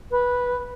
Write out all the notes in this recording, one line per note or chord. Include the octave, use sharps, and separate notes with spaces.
B4